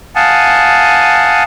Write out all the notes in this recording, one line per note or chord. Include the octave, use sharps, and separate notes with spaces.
F5 F#5 G#5 A5 D#6